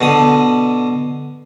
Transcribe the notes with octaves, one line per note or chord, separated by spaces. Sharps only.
B2 D3 D#6